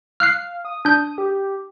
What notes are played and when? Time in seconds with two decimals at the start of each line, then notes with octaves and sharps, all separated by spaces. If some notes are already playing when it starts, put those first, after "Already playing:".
0.20 F5 F6 F#6 C7
0.65 D#6
0.85 D4 G6
1.18 G4